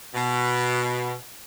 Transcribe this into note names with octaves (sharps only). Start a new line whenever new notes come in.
B2